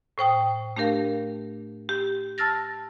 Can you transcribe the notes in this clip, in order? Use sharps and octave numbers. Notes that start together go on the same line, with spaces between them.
A2 C5 G5 D#6
A3 D4 G4 A#4 F5
G4
A5 E6 F6 A6 A#6